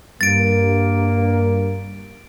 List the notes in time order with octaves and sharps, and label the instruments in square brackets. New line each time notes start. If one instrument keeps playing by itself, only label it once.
[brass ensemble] G2 A#3 [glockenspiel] A6 D7